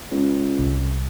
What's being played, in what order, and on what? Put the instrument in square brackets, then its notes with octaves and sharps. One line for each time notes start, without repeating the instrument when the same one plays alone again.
[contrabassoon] C#2
[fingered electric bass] C2